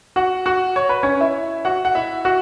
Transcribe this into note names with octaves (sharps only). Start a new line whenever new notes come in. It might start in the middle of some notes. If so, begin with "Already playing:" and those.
F#4 F#5
F#4 F#5
C#5
B4
C#4 C#5
E4 E5
F#4 F#5
F#5
E4 E5
F#4 F#5